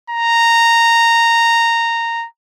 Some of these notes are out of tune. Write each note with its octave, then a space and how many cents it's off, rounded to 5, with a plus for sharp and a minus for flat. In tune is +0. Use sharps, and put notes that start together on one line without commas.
A#5 -10